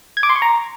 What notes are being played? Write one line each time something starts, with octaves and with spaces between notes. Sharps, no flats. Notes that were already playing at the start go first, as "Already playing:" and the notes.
G#6
D6
C6
C#6
A#5